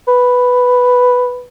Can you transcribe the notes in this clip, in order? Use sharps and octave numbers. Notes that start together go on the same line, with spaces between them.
B4